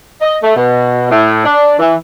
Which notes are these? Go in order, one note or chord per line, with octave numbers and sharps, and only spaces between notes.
D#5
A3
B2
A2
D4
E3